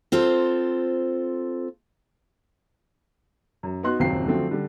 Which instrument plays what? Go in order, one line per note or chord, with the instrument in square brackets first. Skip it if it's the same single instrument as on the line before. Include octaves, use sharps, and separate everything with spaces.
[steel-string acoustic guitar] C4 F4 A4 C5
[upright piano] F#2
B3 D#4 F#4 C6 F#6
D#1 C#2 F#2 C4 C5 C7
D3 F3 F#3 A3 C4
D3 G3